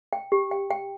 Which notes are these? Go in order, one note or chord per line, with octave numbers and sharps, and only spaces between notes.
G5
G4
G5
G5